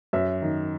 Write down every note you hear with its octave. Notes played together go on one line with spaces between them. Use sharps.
F#2 E5
D#3